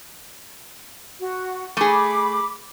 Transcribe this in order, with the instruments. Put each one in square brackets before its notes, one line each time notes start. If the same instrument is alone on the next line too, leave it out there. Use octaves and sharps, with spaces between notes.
[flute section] F#4
[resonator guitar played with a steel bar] A3 G#4 [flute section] B5 D6